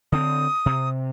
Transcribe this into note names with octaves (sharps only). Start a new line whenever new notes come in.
D3 C4 D#6
C3